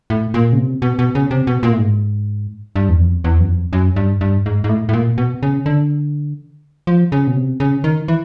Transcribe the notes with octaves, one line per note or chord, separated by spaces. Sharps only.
A2
A#2
C#3
C3
B2
B2
C#3
C3
B2
A#2
A2
G#2
G2
E2
F2
E2
F#2
F2
F#2
G2
G2
G#2
G#2
A2
A2
A#2
B2
C#3
D3
F3
C#3
B2
C3
C#3
D#3
E3